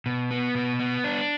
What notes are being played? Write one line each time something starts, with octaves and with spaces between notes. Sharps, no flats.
B2
B3
B2
B3
D4